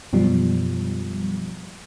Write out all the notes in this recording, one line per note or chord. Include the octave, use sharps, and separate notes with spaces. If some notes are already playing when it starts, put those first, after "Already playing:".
F#2 B2 F3 G3